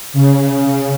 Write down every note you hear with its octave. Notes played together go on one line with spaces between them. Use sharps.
C#3